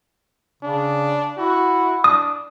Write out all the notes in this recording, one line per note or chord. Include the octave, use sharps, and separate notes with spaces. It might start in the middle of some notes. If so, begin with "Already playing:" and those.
C#3 D4
E4 F#4
D4 D#6